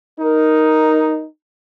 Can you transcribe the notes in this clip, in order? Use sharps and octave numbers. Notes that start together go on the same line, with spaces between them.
D#4 A#4